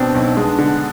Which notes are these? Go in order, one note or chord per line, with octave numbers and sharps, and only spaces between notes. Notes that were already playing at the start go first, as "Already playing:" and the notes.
Already playing: B2 B3 C4 D4
B1
G#3 B3 D4
D3